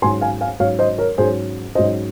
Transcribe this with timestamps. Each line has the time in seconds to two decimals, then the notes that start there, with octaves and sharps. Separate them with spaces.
0.02 G#2 F#3 C#4 G#5 C6
0.21 F5 G#5
0.41 F5 G#5
0.60 G#2 F#3 C#4 C#5 F5
0.79 C5 D#5
0.98 A#4 C#5
1.18 G#2 F#3 C#4 G#4 C5
1.75 G#2 F#3 C#4 C5 D#5